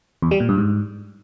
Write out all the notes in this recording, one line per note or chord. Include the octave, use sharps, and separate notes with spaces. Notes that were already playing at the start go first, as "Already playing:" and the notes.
E2
G3
A#2
G2
G#2